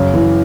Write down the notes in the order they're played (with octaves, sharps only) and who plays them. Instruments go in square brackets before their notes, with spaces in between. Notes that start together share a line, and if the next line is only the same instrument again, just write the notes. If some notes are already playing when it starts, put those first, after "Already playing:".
Already playing: [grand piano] F#2 C#3
E3